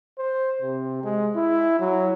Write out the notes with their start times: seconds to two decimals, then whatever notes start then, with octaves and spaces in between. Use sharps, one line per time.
0.18 C5
0.62 C3
1.04 G#3
1.36 E4
1.79 F#3